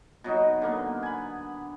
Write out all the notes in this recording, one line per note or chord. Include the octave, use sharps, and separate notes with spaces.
B2 F#3 D#4 D#5
D3 A#3 B3
G#5 B5